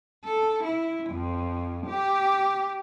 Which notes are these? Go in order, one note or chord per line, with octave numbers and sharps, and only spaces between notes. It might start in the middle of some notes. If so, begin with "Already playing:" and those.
A4
E4
F2
G4